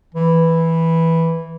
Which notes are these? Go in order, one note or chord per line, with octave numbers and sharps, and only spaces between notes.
E3